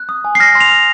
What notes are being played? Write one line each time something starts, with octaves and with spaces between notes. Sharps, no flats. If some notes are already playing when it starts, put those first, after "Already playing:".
Already playing: F#6
D#6
G#5
C7
F6 A#6
C6
F7
F6